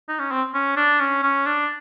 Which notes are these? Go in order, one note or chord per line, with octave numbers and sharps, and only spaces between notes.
D#4
C#4
C4
C#4
D4
C#4
C#4
D4